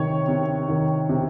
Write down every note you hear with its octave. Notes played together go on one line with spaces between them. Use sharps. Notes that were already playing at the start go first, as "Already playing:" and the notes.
Already playing: C3 D#3 C#5
C3
D#3
C3